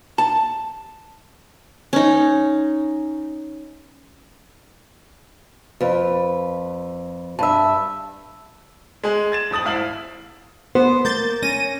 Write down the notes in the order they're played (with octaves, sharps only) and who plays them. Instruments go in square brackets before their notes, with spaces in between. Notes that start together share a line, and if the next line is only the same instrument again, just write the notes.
[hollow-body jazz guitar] A5
[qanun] C#4 D#4
[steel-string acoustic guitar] F2 B4
[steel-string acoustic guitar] G2 E5 [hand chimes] A5 B5 E6
[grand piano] G#3 G#4
G#6 A6 E7
D#1 F2 D#6 A6 F#7
G#1 E4 F5 F6 F#7
[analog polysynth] B3 [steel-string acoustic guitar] C5
[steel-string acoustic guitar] A#3 [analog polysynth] G6 A6
[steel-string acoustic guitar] C#4 [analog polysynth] A#6 D#7